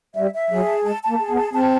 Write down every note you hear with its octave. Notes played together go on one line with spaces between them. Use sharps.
G3 E5
E5
F#3 G#4
A5
G#3 A5
A5
A#3
G#4
B3
A5
C4 A5